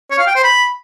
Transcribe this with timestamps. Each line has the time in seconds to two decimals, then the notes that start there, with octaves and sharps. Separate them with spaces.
0.10 C#5
0.19 F5
0.27 G5
0.35 C5
0.44 B5